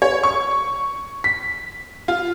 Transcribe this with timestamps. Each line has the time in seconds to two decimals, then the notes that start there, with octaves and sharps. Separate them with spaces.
0.02 C#5
0.23 C#6
1.24 B6
2.08 F4